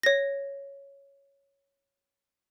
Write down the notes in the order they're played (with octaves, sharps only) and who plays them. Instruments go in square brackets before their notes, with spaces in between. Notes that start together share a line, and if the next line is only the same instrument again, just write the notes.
[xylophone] C#5 A#6